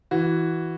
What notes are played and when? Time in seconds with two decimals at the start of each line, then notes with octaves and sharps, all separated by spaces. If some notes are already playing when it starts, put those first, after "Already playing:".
0.11 E3 F#4